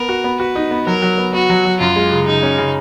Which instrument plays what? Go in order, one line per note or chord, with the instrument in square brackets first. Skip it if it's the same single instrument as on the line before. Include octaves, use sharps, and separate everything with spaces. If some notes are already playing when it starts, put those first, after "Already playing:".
Already playing: [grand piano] B3 [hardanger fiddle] A#4
[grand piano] F#4
B3
[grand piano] F#4 [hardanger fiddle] B4
[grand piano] D#4
B3
[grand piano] F#3 [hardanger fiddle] A#4
[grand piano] F#3
B3
[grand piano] B3 [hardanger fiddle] F#4
[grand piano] F#3
F#3
[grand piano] F#2 [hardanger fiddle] F4
[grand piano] G#3
C#3
[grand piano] C#3 [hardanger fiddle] D#4
[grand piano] C#4
C#3